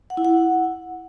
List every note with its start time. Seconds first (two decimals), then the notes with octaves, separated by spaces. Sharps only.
0.10 F#5
0.17 E4
0.25 F#5